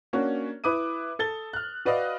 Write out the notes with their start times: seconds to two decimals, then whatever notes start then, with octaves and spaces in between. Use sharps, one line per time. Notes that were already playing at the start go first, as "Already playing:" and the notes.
0.13 A#3 C#4 D4 F#4
0.64 E4 B4 D6 D#6 D#7
1.19 A4 A6 G7
1.53 F6 F#6
1.85 F#4 B4 D5 D#5 F5